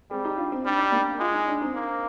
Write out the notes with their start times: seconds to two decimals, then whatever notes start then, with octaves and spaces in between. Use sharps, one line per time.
0.11 G3 G#3 C4
0.25 D#4 G4
0.37 D4 F4
0.51 C4 D#4
0.65 G3 D4
0.78 D#4
0.92 A#3 D4
1.19 G#3 F4
1.33 D#4
1.47 D4
1.61 C4 D#4
1.75 A#3